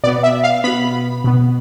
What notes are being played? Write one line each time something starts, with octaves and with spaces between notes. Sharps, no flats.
B2 B3 D5
E5
F5
B2 B3 B5
B2 B3